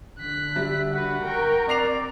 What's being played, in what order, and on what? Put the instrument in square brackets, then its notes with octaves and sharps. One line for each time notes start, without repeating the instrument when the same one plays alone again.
[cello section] D3 [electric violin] F#6 B6
[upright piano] G3 [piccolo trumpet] E5
[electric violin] F#4 B4 [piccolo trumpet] F#5
[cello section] A#4 [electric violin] G5 C#6
[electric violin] C4 [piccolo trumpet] D5 [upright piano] A#5 C7 F7